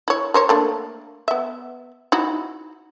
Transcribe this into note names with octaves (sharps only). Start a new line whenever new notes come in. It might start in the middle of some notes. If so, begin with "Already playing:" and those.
E4 C#5
A#4 C5 C#5
A3 A#3 D4
B3 E5
D#4 E4 F#4